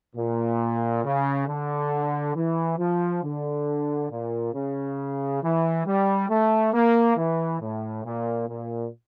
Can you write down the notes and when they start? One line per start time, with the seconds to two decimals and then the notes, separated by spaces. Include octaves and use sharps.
0.16 A#2
1.04 C#3
1.47 D3
2.35 E3
2.78 F3
3.23 D3
4.10 A#2
4.53 C#3
5.42 E3
5.86 G3
6.29 A3
6.73 A#3
7.16 E3
7.61 A2
8.04 A#2
8.48 A#2